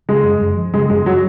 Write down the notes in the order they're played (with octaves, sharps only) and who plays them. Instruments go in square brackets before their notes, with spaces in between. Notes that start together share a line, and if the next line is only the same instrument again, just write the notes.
[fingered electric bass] C#3 [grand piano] G#3
[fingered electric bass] F#2
F#2
F3
[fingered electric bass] C#3 [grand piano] G#3
[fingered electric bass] F#2 [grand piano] G#3
[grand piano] F#3